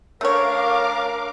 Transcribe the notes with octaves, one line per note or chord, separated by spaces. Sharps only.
A3 C#4 D4 A#4 C#5 F5 D6